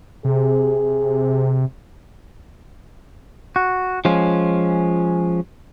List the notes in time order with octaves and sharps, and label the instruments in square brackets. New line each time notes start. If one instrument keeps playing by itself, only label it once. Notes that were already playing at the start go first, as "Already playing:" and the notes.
[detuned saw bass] C3 [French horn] G#4
[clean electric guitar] F#4
F3 G#3 C#4 F4